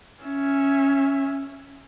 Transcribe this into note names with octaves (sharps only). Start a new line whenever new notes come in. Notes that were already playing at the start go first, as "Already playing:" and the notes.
C#4 E5